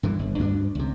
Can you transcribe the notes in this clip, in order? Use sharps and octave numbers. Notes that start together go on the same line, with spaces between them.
G2 D3 E3
G1
D2 G2 C#4 D4
C#2 C3